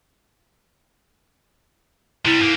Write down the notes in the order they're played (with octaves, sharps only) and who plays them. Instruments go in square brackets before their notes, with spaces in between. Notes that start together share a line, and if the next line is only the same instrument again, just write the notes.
[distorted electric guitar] C3 G3 [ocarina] E4
[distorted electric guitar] G#2 A#3